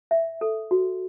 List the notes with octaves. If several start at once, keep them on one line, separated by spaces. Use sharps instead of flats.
E5
A4
F#4